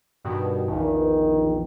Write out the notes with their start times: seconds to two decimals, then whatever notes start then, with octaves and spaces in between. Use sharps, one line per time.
0.24 G2 B2 D#3
0.68 A#1 E2 D#3